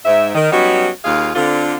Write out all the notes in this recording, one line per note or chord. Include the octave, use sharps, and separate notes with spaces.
G#2 E5
D#3
F#3 G3 B3 C#4 D#4 F#4
D#2 F4 G#4 F5
D3 C4 F4